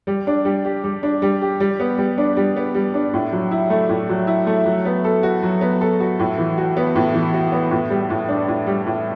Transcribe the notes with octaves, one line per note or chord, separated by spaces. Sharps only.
G3
D4
G3
G4
G3
D4
G3
G4
G3
B3
G3
D4
G3
B3
G3
D4
A2
F#3
E4
A3
A2
F#3
E4
A3
F#3
B3
A4
F#4
F#3
B3
A4
F#4
A2
E3
F#4
B3
A2
E3
F#4
B3
A2
G3
A2
D4
A2
G3
A2